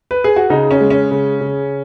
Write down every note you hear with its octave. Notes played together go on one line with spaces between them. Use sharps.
B4
G#4
F#4
C#3 D#4
C#4
G#3
C#4
C#3
C#3